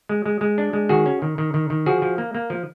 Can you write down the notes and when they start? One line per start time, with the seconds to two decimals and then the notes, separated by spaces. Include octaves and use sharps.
0.09 G#3
0.26 G#3
0.41 G#3
0.58 D4
0.73 G#3
0.89 D#3 F#4 G#4
1.06 C#4
1.22 D#3
1.38 D#3
1.54 D#3
1.70 D#3
1.86 F3 F#4 G#4
2.02 F3
2.18 A#3
2.35 A#3
2.50 F3